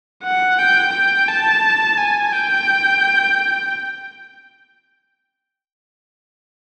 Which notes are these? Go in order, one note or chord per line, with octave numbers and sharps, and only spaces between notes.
F#5
G5
G5
A5
G#5
G5